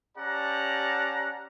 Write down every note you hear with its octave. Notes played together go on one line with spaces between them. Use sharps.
C#4 G4 D5 F#5 A5 A#5